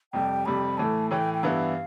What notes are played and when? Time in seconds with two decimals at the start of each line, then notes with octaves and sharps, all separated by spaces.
0.13 F2 C3 G3 G5
0.45 F2 C3 G3 B5
0.77 A2 E3 A3 A5
1.10 A2 E3 A3 G5
1.34 G5
1.43 G2 E3 B3 E4 F5